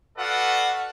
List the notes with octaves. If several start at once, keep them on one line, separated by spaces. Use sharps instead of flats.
F#4 A4 B4 D5 F5 F#5